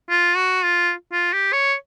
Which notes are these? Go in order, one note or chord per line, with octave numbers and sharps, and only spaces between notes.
F4
F#4
F4
F4
G4
C#5